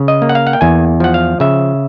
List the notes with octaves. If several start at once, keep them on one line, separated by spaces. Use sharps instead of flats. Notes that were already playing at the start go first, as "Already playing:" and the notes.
Already playing: C#3
D#5
A#3
F#5
F5
F#5
G5
E2 G#5
F3 F#5
F5
C#3 E5